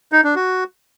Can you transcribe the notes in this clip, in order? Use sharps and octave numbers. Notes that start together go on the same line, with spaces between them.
D#4
D4
F#4